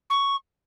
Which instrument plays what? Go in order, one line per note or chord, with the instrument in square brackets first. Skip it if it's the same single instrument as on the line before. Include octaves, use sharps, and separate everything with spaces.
[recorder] C#6